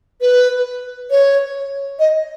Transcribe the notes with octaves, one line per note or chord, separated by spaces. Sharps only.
B4
C#5
D#5